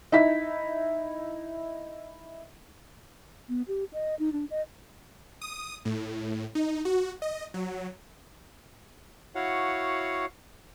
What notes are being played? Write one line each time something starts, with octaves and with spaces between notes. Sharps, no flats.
D#4 E4 B6
B3
G4
D#5
D#4
D4
D#5
D#6
A2
D#4
F#4
D#5
F#3
E4 F#4 C#5 F5 F#5